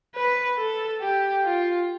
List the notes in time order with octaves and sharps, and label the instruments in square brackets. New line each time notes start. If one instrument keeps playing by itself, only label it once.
[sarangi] B4
A4
G4
F4